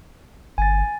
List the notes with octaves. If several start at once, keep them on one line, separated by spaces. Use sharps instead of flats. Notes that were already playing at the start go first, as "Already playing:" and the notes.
G1 G#5 A6